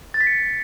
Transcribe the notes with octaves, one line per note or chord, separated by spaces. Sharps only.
A6
B6
C#7